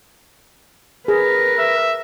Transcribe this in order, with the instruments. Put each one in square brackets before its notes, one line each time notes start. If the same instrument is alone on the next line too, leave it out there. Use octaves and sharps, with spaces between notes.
[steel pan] G#4 [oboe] A#4 [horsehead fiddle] B4
[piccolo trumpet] E5